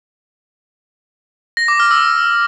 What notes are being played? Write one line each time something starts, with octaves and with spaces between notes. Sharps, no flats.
A#6
D6
F6
E6